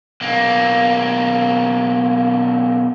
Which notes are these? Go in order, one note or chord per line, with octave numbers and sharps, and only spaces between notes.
B1 A#3